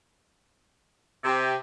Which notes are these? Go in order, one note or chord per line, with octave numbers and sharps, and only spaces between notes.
C3